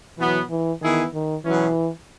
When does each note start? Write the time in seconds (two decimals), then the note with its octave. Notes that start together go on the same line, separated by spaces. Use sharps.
0.18 B2 E3 F#3 B3
0.50 E3
0.81 D#3 E3 B3 E4 G#4
1.14 D#3
1.45 B2 E3 F#3 C#4